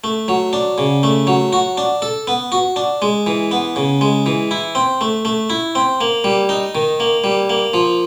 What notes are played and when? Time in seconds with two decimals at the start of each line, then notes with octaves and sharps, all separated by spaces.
0.04 A3
0.28 F#3
0.53 D4
0.78 C#3
1.03 A3
1.27 F#3
1.53 F#4
1.78 D4
2.02 A4
2.27 B3
2.52 F#4
2.76 D4
3.02 G#3
3.27 E3
3.51 B3
3.76 C#3
4.01 G#3
4.26 E3
4.51 E4
4.75 C4
5.01 A3
5.25 A3
5.50 E4
5.75 C4
6.01 A#3
6.24 G3
6.49 D#4
6.75 D#3
7.00 A#3
7.24 G3
7.50 A#3
7.74 F3